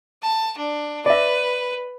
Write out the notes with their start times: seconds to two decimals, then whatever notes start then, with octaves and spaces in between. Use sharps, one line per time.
0.23 A5
0.58 D4
1.06 B4 D5 E5